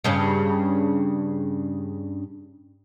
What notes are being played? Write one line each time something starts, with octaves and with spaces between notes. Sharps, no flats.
G2 C#3 C#4